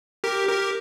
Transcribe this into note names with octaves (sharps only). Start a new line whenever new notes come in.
G4 A#4
G4 A#4